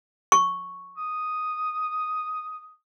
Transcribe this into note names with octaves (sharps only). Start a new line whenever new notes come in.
C#6
D#6